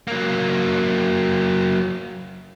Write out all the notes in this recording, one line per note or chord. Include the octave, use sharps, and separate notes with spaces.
F#3 A#3